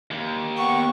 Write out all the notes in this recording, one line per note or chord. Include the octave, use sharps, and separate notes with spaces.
D#2
B3 F#5 G5 C#6